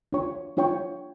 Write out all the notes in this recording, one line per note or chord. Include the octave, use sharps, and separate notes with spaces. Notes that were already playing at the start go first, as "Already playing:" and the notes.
D4 F4 C#5 G5 C#6
D4 F4 C#5 G5 C#6